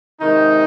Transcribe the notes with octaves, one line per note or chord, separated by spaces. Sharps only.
C3 D#3 G#3 D#4